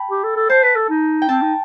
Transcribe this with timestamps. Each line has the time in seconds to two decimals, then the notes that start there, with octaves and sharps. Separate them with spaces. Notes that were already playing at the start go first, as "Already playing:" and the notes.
Already playing: G5 A5 B5
0.11 G4
0.24 A4
0.36 A4
0.49 C5 A5
0.63 B4
0.76 A4
0.90 D#4
1.22 G5
1.29 C4 A5
1.42 D#4